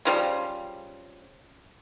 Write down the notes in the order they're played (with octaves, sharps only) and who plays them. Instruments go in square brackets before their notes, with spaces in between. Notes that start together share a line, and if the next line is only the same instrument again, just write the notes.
[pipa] C#3 F3 G3